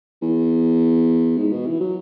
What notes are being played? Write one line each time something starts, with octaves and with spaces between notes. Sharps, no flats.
E2
G#2
B2
E3
F#3